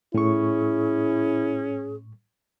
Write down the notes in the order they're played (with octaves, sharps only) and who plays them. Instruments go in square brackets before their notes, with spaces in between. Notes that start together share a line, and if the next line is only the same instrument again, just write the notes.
[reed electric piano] A2 C#6 [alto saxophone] C#4 [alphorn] E4 [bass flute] G#4